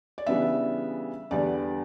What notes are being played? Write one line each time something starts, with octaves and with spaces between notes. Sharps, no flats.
D5
C#3 E3 G3 B3 D4 E5
E2 D3 G3 B3 D4 D5